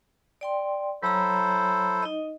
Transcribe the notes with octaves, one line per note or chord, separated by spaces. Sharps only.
D5 G5 C6
F#3 E4 A4 C5 C#5 A#5
D#4 D#5